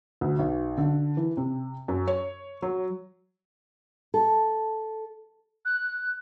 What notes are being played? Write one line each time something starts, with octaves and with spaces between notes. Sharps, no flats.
D2
B1
D3
E3
C3
F#2
C#5
F#3
A4
F#6